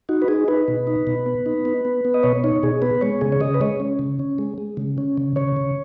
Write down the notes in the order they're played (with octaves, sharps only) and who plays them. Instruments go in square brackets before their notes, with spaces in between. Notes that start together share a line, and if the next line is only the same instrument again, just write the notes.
[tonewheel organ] D#4 F#4
B4
D#4 G#4
D#4 B4
B2
D#4
B2
B3
D#4
B3
B3
B3
D#5
B2 C#5
D#4 C#5
B2 G#4
B3 B4
G#3 C#5
C#3 G#4
C#5
C#3 D#5
B4
G#3 C#5
C#4
C#3
C#4
G#3
G#3
C#3
C#4
C#3
C#3 C#5
C#3